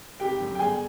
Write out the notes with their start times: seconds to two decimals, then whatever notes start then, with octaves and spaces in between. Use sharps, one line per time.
0.20 G#1 G4 G5
0.39 F#2 D3
0.55 G5
0.59 G1 G#4 G#5